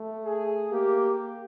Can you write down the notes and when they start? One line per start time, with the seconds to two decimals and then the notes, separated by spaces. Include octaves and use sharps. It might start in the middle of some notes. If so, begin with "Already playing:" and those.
Already playing: A3
0.25 G#4
0.71 A#3 G4